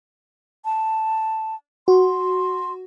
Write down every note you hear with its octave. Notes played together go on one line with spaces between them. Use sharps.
A5
F#4 C6